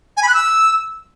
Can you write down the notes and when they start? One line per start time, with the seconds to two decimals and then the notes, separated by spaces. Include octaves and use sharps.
0.17 G#5
0.23 B5
0.28 F#6
0.34 E6